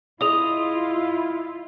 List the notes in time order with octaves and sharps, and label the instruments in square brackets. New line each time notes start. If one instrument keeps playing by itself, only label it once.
[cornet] E4 [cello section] F4 [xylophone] G#4 D#6 [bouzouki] D#5